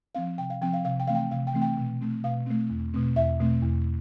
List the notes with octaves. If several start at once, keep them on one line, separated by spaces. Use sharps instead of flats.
F3 C4 F5
C3 G5
F5
F3 C4 G5
F5
C3 F5
G5
E3 A3 C4 F5
G5
C3 F5
G5
E3 A3 C4
G5
B2
A3 C4
B2 F5
A3 C4
E2
B2 A3 C4
E2 E5
B2 A3 C4
E2